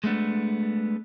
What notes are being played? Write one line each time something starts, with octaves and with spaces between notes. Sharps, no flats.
G#3 A3 B3 D4